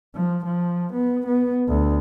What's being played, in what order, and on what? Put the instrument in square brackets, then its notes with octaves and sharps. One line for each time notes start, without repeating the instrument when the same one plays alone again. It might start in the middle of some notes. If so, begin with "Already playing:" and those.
[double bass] F3
F3
B3
B3
D2